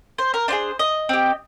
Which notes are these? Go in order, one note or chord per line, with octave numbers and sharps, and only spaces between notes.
C5
A#4
D4 F4 G#4 C5
D#5
C4 G4